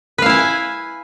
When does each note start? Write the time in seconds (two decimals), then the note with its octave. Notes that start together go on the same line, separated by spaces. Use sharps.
0.18 B4
0.22 F5
0.26 E4
0.30 G#5